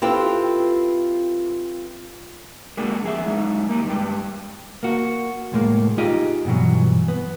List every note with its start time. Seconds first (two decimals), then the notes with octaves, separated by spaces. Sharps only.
0.02 C4 E4 F4 G4 A4 B4
2.77 G#3 A#3 D4 F#4 G4
3.04 F2 G#4 E5
3.26 F#3 G#3 D#4
3.69 A#3 D#4 G4
3.85 E2 G2 G3 G#3 G5
4.83 A#3 F#4
5.52 C2 A2 G#3 A#3
5.98 D#4 F4 G4 G#4 D#5
6.45 G2 B2 E3 F#3
7.08 B3